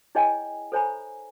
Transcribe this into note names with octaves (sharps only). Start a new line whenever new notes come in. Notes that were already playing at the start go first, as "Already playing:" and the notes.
E4 G#4 C#5 D#5 G5 G#5
A4 C5 C#5 G#5 A#5 B5